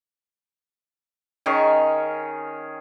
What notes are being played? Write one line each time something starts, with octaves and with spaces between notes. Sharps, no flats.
D#3 C#4 G#4 C#6